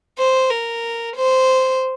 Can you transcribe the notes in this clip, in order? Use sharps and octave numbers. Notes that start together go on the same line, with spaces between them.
C5
A#4
C5